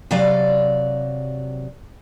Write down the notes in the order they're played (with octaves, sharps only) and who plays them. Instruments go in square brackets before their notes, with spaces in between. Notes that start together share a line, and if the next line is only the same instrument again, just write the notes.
[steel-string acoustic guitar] C3 F#3 D5 F5